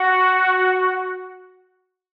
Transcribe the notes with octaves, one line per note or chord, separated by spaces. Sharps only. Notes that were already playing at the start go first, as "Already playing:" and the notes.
Already playing: F#4